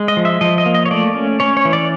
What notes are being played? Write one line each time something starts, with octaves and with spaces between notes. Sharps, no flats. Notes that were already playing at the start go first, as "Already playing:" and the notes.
Already playing: G#3
D#5
F3
E5
F3 D#5
D#5
A#3
D#5
C#5
A3 D5
C#4
C#4 C#5
C#5
E3
D5